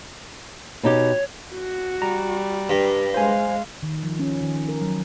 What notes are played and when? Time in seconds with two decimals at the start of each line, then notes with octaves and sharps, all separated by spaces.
0.83 B2 D#4 G4 C#5
1.51 F#4
2.02 G3 A#5
2.69 G2
3.14 G#3 C5 F5 G#5
3.83 D#3
4.03 F3
4.19 C#4
4.41 D#3
4.69 A#4
4.81 F#3